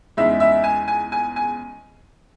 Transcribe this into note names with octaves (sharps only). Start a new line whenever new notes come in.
E2 C#3 G#3 D#4 E4 E5
E4 E5
G#5
G#5
G#5
G#5